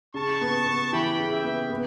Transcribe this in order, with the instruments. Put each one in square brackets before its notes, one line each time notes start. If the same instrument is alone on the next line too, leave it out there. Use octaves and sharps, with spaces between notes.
[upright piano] C#3 [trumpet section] A5 C#6
[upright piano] B3
B3
[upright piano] E3 [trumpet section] G5 B5
[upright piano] C#3
[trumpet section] E5 G5
[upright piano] B3
B3